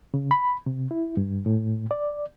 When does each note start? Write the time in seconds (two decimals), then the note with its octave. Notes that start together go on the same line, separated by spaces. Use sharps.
0.14 C#3
0.31 B5
0.66 C3
0.91 E4
1.17 G2
1.46 A2
1.91 D5